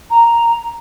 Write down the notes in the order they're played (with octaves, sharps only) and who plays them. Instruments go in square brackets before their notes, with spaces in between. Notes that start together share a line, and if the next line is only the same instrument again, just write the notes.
[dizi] A#5